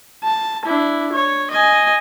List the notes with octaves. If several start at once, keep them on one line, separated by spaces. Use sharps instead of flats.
A5
D4 E4
C#5
D#5 G#5